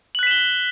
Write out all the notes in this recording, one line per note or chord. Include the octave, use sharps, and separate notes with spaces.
F#6 B6 E7 F#7 G7